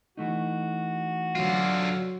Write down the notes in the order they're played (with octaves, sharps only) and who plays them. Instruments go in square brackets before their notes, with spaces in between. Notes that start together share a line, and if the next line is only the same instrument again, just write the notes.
[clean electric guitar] E3 A3 D#4 [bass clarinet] F#4
[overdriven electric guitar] D3 F4 [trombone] F#3